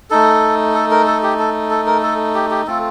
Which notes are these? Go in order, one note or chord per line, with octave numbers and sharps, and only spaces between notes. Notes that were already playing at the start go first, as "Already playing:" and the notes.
A3 D#4 A4
A4
A#4
A4
G4
A4
A4
A#4
A4
G4
G4
A3 C4 F4 A4